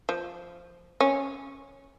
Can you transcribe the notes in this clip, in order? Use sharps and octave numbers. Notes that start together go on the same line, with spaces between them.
F3
C#4